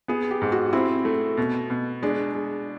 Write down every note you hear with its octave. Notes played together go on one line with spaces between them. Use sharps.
B3 G#4
G4
G#2
F#4
C4 E4
A3
B2
B2
G#3 D4
G#3